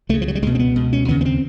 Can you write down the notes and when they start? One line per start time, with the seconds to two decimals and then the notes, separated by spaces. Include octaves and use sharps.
0.09 C#2 C#3 A3
0.22 F3
0.28 F#3
0.35 G3
0.42 C#2 B2 G#3
0.55 C4
0.59 B3
0.76 C#2 B2
0.93 C#4
1.09 D#2 C#3 B3
1.21 B3
1.25 C4